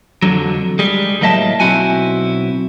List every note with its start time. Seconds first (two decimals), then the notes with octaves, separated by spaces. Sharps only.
0.22 F2 B2 D3 F#3
0.79 G3 G#3
1.21 A2 F#3 A#3 D#5 E5 A5
1.60 B1 C4 E4 F#4 G#5